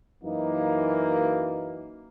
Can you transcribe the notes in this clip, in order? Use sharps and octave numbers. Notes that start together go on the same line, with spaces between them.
F#2 E3 A#3 D#4